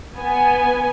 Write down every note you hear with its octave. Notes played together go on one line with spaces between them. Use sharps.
B3 G#5